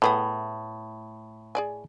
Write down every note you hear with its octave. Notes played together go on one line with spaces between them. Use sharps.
A2 A3 B3 G#4
G#4 D5 G#5